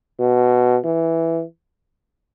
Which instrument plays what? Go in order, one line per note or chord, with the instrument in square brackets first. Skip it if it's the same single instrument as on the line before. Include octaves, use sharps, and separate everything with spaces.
[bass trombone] B2
E3